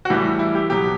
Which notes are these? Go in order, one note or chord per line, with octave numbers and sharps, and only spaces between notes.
F#4
A2 E3 G3 G4
E4
G4
B2 F#3 G4